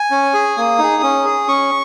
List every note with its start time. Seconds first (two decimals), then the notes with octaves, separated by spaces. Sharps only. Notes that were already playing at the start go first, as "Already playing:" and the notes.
Already playing: G#5
0.11 C#4
0.34 G#4
0.57 A#3 D#6
0.79 D#4 G#4
1.03 C#4
1.25 G#4
1.48 C#4 C#6